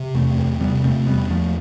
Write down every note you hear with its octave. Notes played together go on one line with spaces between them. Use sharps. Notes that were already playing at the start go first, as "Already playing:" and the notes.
Already playing: C3
E2 A3 C4
E2
C3 G3 B3
C3 A3 C4
E2 G3 B3
E2 F3 A3